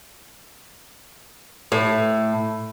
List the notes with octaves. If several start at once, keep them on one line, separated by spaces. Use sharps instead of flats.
A2